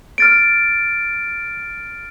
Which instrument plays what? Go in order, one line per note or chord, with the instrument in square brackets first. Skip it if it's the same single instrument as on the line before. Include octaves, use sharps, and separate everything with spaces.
[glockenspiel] F6 A6 D7